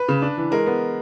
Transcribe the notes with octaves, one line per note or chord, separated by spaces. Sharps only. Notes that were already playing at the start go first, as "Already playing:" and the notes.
Already playing: B4
C#3
D4
E3
G#3 A#4
B3